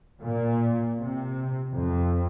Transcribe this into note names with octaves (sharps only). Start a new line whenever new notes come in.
A#2
C3
F2